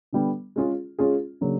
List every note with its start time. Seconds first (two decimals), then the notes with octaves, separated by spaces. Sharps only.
0.13 D3 G3 B3
0.56 G#3 C#4 F4 G#4
0.99 G#3 C#4 F4 G#4
1.41 C#3 F#3 A#3 D4